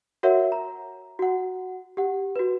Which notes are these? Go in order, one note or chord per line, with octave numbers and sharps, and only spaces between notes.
F#4 A#4 C#5 E5 F#5
A#5
F#4 F#5
G4 F#5
F#4 B4